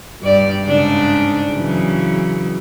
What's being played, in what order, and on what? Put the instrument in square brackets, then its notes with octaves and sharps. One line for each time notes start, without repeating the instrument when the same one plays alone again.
[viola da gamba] G2 D5
G#2 C#3 D4
C#3 E3 F#3